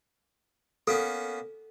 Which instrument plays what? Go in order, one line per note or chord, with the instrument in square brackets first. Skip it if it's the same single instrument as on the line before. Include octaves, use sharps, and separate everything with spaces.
[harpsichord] A#3 B3 C#4 [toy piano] A4